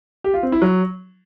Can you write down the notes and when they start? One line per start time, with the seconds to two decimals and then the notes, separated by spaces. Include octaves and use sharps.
0.24 G4
0.34 F4
0.43 C4
0.52 E4
0.62 F#3